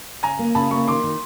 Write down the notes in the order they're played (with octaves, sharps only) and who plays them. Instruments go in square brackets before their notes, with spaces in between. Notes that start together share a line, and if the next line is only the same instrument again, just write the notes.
[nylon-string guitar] C#3 [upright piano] G#5 A#5
[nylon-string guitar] A#3
[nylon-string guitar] C#3 [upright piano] A5 B5
[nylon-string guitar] A#3 [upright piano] B5 C#6
[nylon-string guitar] D#3 [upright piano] C6 D6
[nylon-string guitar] D#3